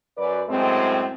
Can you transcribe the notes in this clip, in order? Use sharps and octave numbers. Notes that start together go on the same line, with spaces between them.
F#2 B4 D5
F#2 A2 G#3 C4